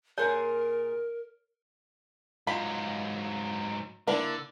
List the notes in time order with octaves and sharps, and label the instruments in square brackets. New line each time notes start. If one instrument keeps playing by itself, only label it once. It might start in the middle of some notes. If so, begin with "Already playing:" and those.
[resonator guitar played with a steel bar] A#2 G#4 [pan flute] A#4 [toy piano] C#5
[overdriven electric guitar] G#2 F#3 [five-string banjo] F4 B5
[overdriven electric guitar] D3 [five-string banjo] A#3 D4 E4